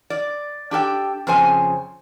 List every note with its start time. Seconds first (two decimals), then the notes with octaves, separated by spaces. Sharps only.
0.10 D5
0.71 D4 G4 A4 G5
1.27 F2 C#3 C5 G#5